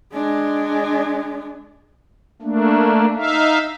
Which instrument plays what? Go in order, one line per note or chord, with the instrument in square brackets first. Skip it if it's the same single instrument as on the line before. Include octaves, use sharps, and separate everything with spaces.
[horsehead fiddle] G#3 D4
[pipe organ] A3 A#3 D4
D#4 E5 F5